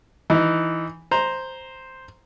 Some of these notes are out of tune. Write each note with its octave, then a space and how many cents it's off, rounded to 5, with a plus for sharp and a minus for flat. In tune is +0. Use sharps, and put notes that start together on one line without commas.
E3 +0 D#4 +0
C5 +0 A#5 +0